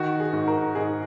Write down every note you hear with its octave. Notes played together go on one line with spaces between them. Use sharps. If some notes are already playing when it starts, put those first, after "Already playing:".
Already playing: D#3 F#4
G#4
G#2
A#4
G#2 G#4